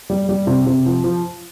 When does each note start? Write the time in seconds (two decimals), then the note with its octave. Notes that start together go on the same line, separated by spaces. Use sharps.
0.10 G3
0.29 G3
0.47 C3
0.66 C3
0.86 F3
1.04 F3